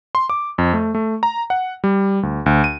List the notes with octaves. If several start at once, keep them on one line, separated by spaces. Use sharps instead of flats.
C6
D6
F2
A3
A3
A#5
F#5
G3
D2
D2
D#7